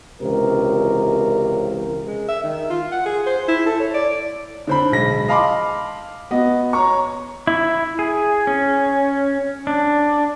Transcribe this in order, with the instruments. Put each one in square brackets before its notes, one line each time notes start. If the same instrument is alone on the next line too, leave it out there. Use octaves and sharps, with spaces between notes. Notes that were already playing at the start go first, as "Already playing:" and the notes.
[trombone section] C#2 C3 E3 A#4
[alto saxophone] G#3
E5
D#3
F4
F#5
G#4
C5
E4
A4
C#5
D5
[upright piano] D3 C5 B5
B1 G#3 A#6
D#5 F5 A5 B5 C6 D6
B3 F#4 D#5
C#5 A#5 C#6
[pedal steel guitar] E4
G#4
C#4
D4